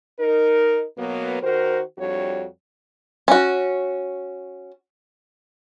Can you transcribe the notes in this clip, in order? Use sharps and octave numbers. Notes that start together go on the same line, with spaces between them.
D#4 A#4
B2 F#3 A#3 B3
D#3 F#4 A#4 C5
F2 G3 D4 F#4 C#5
C#4 F#4